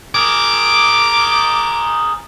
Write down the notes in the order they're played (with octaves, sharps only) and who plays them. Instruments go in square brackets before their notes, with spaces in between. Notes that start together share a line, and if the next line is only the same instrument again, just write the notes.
[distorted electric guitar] G#4 A#4 [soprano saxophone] D6